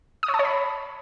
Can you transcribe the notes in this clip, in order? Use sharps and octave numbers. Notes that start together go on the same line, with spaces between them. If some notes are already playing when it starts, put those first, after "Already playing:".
D#6
C#5
A5
C#5
B5